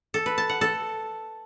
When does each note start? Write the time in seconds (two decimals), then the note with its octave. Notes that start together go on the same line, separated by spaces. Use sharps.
0.14 A4
0.26 B4
0.38 A5
0.49 F#5
0.61 A4